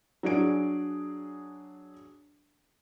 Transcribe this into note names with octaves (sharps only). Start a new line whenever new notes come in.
F#3 D4 G#4 D7